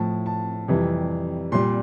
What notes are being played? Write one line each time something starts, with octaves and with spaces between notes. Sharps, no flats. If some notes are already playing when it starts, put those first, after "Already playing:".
Already playing: A2 F3 A5
A5
F2 C3 E3 G3
A#2 G3 C6